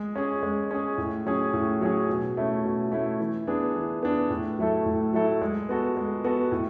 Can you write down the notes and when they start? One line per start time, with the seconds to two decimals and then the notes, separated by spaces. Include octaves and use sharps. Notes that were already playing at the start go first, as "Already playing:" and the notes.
Already playing: G#3
0.16 C#4 G#4
0.43 G#3
0.71 C#4 G#4
0.98 A2
1.26 F#3 C#4 G#4
1.53 A2
1.81 F#3 C#4 G#4
2.09 B2
2.37 A3 C#4 E4
2.64 B2
2.92 A3 C#4 E4
3.20 E3
3.47 B3 D4 G#4
3.75 E3
4.03 B3 D4 G#4
4.30 A2
4.59 F#3 A3 E4 A4
4.86 A2
5.13 F#3 A3 E4 A4
5.42 G#3
5.69 B3 F#4 A4
5.97 G#3
6.24 B3 F#4 A4
6.52 A2